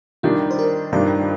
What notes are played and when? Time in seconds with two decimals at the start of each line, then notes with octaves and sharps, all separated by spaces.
0.23 D#3 G3 D4 F4
0.51 C5
0.59 A#4
0.93 G2 D#3 G3 D4 D5